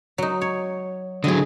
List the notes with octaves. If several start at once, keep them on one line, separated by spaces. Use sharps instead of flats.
F#3 D#4
C#5
D3 F#3 G#4 D#5